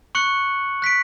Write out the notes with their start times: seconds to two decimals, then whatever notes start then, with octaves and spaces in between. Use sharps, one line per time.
0.15 C#6 F#6 C#7 F#7
0.82 F#6 B6 D7